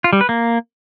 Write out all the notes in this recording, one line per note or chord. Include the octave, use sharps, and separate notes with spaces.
F4
G3
B4
A#3